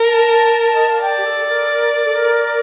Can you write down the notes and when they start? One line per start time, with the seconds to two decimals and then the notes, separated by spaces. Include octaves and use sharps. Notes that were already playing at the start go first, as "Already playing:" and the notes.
Already playing: A#4
0.08 A5
0.74 D#5
0.88 F5
1.01 D5 G5
1.18 G4
1.25 A4
1.49 A#4
1.61 A4
1.72 A#4
1.95 A#4
2.05 A4
2.15 A#4